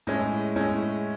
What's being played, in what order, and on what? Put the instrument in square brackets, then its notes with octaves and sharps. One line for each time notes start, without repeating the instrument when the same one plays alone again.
[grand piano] A2 G#3 C#4 E4
A2 G#3 C#4 E4